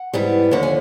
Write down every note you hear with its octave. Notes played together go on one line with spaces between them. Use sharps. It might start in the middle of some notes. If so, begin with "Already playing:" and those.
Already playing: F#5
G#2 E3 G3 B3
D#2 D3 F3 F#5
G#5